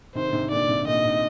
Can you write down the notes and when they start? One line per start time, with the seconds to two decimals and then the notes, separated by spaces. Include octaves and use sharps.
0.15 C3 D#3 C5
0.27 D3
0.33 G#2 C3
0.51 A#2 D3 D5
0.69 G#2 C3
0.81 D#3
0.86 A#2 D3 D#5
1.05 C3 D#3